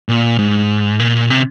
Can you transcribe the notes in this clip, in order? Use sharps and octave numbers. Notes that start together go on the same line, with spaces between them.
A#2
G#2
A#2
C3